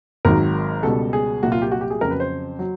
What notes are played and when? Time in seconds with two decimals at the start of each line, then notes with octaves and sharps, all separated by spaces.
0.25 G#1 G#2 D#3 F#3 A#4
0.83 C#2 B2 G3 A4
1.13 G#4
1.42 C2 A#2 F#3 F#4
1.52 F4
1.62 G4
1.72 F#4
1.81 G4
1.90 G#4
2.01 F2 C#3 F#3 A#4
2.11 B4
2.20 C5
2.59 F#3